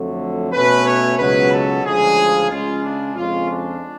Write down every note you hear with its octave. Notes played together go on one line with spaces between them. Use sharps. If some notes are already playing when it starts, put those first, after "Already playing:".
Already playing: F2 D3 F#3 A3
B2 A3 C#4 B4
C#5
C#2 B2 F#3 B4
A4
D2 C#3 F3 G#3 G#4
C#2 C#3 G#3 C#4 F4
D4
F2 C#3 G#3 C#4 F4
D4